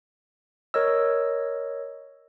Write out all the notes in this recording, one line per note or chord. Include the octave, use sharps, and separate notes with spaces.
A#4 C#5 D#5 E6